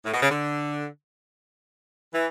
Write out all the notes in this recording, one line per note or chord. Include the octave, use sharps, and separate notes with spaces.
A2
B2
C#3
D3
E3